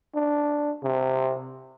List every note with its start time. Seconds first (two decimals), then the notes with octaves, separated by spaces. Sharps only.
0.15 D4
0.83 C3